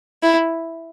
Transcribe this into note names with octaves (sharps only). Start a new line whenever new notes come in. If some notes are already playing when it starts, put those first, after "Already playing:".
E4